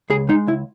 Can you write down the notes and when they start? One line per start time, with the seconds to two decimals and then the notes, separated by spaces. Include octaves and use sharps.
0.10 C#2 G#4
0.29 G#3 D#4
0.47 C#2 E4